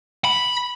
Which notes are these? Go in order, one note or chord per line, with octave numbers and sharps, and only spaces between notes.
B5